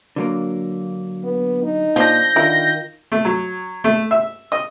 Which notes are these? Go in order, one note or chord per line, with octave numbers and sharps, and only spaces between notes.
D3 F#3 A#3
B3
D#4
A#2 F3 D4 G6 A#6
D3 D#3 E4 F4 A#4
A3
F#3
A3
E5
D#5